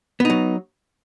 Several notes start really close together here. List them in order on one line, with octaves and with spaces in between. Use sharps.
B3 D#4 F#3